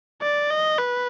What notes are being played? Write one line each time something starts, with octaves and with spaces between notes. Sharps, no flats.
D5
D#5
B4